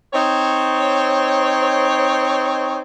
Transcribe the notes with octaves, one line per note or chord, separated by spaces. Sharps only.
C4 D#4 C#5